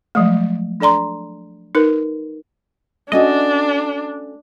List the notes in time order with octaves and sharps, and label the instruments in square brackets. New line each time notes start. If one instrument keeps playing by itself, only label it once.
[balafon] F3 F#3 G#3 A3
D4 A4 D5 A#5 C6
D#4 A#4 B4
[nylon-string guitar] A3 C#4 F#4 [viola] D4 [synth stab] D#5